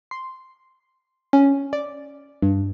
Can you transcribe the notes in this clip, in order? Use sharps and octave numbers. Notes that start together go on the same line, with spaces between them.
C6
C#4
D5
G2